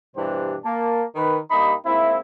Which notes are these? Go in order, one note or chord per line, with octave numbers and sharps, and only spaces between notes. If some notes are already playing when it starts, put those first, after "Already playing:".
G2 B2 E3 D4 G4 C5
A#3 A5
D#3 B4
G2 A#3 D#4 G4 D#5 B5
G#2 A#3 C4 E4